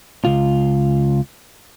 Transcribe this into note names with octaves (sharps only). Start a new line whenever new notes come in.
C#2 F4